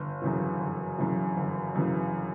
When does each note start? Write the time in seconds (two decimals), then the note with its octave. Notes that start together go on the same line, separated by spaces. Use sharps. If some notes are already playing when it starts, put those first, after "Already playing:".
Already playing: G1
0.22 F#2 C#3 E3
0.60 G1
0.98 F#2 C#3 E3
1.37 G1
1.75 F#2 C#3 E3